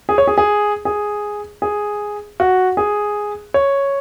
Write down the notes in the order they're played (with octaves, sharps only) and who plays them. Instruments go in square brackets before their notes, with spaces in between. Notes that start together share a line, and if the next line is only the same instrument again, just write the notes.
[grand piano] G#4
C#5
G#4
G#4
G#4
G#4
F#4
G#4
C#5